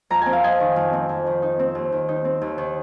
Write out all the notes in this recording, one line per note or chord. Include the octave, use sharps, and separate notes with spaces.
F2 A#5
C4 G#5
F5
F2 D#5 G#5
D#3
F2
C4
F2
D#3
D#4
C4
D#2
D#3
D#4
C4
D#2
D#3